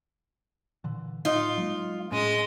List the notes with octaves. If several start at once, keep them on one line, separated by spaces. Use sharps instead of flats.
A#2 D3 E3
A2 D#4 F4
F#3 G#3 A#3
A2 G#3 C#4 D#5